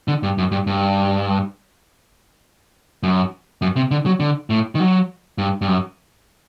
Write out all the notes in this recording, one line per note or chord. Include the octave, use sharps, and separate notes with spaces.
D3
G2
F#2
G2
G2
F#2
F#2
C3
D3
F#3
D3
A2
D#3
F#3
G2
G2
F#2